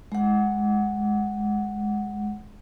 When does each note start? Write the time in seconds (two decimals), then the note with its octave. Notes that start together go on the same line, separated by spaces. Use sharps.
0.12 G#3 F#5